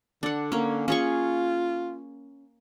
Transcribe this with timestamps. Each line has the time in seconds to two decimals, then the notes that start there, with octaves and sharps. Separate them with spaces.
0.23 D3 D4 F#5
0.52 A#3 C#4
0.88 C#4 F4 G#4 C#6